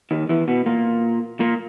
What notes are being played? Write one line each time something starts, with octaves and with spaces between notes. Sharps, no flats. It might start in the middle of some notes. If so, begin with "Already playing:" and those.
D#2 D#3
E2 E3
B2 B3
A#2 A#3
A#2 A#3